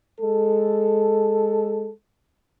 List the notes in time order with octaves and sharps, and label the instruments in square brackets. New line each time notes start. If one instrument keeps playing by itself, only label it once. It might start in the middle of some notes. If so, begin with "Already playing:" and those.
[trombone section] G#3 A4